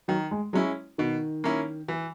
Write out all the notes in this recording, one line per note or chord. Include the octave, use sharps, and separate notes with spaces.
D#3 F#3
G#3
F#3 G#3 C#4 E4
B2 D#3
A#3 C#4 E4
E3